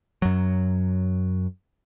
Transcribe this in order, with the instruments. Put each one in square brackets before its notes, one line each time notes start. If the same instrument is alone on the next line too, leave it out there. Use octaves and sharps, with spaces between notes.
[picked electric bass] F#2 F#3